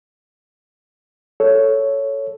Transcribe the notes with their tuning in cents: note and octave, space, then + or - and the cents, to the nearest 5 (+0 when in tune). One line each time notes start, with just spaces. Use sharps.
A4 +0 C#5 +5